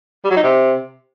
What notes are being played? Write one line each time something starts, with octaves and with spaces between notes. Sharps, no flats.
G3
F#3
D#4
C3